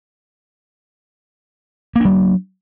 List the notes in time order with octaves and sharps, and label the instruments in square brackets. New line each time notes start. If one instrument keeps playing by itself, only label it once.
[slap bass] A#3
D4
F#3